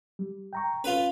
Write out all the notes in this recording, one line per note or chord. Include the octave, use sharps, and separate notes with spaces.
G3
G5 A#5 C#6
C#4 F4 B4